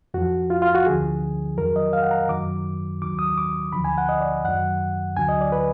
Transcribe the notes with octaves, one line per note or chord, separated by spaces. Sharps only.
F2 F3 F#4
F4
F4
F#4
D2 D3 F3 G#4
F2 D#3 F#3 A#4
D#5
F5
F#5
A#5
F#2 D#3 F#3 D6
D#2 D#3 F#3 D6
D#6
D6
D2 D3 F3 B5
G#5
F#5
D#5
D5
F#2 D#3 F#3 F#5
D2 D3 F#3 G#5
D#5
D5
B4